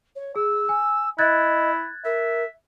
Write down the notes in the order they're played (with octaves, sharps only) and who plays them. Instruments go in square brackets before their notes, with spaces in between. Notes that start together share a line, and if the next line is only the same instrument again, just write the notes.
[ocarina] C#5
[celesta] G#4 [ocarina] E6
[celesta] G#5
[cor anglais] E4 [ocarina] D#5 [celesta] F#6 G#6 A6
[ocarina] A#4 [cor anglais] E5